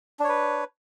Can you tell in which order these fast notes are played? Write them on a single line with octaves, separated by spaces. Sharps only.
D4 C#5 B4